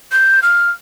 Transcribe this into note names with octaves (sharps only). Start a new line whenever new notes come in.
G6
F6